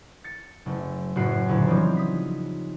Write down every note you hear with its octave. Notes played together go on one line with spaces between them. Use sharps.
A6 C#7
F#1 A3
F#1 F#2 A2 F#4 C7
D2 A#2 E4 B4 C#5
E3 F3 G3 C4 C#4 D#4
D#6 B6